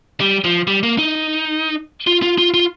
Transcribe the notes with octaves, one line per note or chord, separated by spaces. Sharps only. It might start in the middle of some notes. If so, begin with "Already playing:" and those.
G3
F3
G3
A#3
D#4
F4
F4
F4
F4